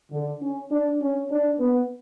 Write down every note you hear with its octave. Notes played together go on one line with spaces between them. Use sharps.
D3
C#4
D4
C#4
D4
B3